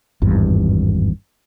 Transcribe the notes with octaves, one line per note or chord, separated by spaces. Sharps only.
G#1 E2 G2